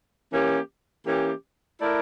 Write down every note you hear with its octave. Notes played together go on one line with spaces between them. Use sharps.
E3 A#3 C#4 G4
E3 A#3 C#4 G4
A3 E4 A#4 D5